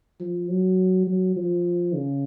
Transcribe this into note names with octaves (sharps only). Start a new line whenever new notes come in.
F3
F#3
F#3
F3
C#3